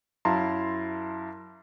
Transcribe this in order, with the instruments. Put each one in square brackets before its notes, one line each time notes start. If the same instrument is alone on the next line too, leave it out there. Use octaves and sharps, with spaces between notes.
[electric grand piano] F#2 E4 F5 A5 A#5 C6